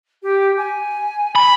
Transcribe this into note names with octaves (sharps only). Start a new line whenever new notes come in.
G4
G#5
B5